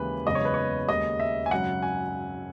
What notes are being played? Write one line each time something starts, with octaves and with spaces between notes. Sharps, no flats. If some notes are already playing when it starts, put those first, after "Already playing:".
Already playing: D#2 C#3 E3 G#3 B4
F#1 E2 C#3 G#3 B3 D#5
C#5
B4
C#5
D#2 C#3 G#3 D#5
E5
G#5
G#1 F#2 C#3 F#5
G#5